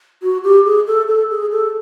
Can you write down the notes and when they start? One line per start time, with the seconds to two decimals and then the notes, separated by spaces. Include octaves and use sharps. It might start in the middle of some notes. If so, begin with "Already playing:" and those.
0.22 F#4
0.44 G4
0.66 G#4
0.87 A4
1.08 A4
1.31 G#4
1.52 A4